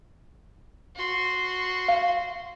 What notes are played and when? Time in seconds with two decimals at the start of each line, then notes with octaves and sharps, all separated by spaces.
0.96 F#4 C6
1.88 F5